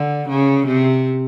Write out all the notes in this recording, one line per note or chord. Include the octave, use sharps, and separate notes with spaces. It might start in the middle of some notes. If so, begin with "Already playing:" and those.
Already playing: D3
C#3
C3